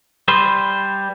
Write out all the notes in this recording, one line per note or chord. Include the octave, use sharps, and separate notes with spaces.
G3 B4 C5